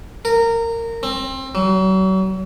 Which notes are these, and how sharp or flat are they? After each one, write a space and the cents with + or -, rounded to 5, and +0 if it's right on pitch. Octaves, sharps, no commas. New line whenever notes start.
A#4 -20
C4 +25
F#3 +40